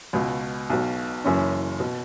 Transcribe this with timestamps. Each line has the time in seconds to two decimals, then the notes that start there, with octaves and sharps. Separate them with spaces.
0.13 C#2 B2
0.70 B1 B2
1.24 F#1 F#2 E3 C#4
1.80 B2